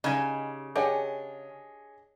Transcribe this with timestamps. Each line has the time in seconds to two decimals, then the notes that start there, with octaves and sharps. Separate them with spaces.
0.04 C#3 G3 D#4 D#5 G#5
0.76 D4 G4 G#4 C#5 D#5 F#5 G#5